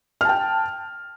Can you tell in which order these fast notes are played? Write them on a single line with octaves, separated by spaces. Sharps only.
F6 A5 G5